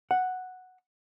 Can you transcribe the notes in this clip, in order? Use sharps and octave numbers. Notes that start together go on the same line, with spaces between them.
F#5